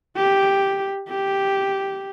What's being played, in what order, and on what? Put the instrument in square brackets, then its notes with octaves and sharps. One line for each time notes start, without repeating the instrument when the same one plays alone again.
[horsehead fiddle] G4
G4